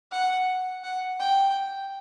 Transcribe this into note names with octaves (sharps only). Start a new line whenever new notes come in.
F#5
F#5
G5